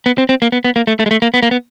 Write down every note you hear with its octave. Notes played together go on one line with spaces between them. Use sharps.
B3
C4
C4
A#3
B3
B3
A#3
A3
A3
G#3
A3
A#3
B3
A#3
B3